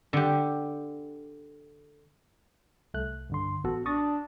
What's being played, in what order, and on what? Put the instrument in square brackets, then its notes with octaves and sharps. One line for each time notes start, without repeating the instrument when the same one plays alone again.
[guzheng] D3 G4
[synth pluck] C2 A3 F#6
[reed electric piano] G2 D3 C6
[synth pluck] A1 A4 [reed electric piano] B3 F#4
[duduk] D4 [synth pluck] C#6 A6 A#6 [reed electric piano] D#6